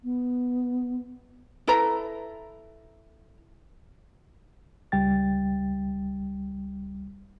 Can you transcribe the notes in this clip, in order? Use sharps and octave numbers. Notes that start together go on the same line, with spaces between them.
B3
E4 A4 B4 A#5
C#2 G3 G5 A6